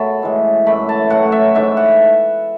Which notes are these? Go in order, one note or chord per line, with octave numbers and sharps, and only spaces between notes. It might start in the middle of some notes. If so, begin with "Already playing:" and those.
Already playing: F#2 C#3 F#3 A3 B3 A5 B5
A2 E3 G#3
F#2 E3 A3 B5
A5
A2 F#3 A3 F#5
E5
G#2 E3 A3 E5
F#5